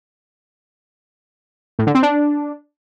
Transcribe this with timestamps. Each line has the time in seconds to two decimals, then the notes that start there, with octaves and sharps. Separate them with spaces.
1.79 A2
1.87 D3
1.95 C4
2.03 D4